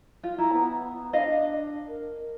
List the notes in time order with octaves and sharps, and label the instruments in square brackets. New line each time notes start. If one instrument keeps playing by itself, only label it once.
[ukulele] F4
[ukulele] E4 [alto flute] A#5
[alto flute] B3
[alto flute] D4 [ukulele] D#5 F5
[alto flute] A#4